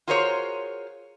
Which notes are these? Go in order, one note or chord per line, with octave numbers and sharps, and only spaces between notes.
F4 F#4 G#4 A#4 C5 C#5